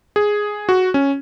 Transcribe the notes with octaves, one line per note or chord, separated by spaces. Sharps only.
G#4
F#4
C#4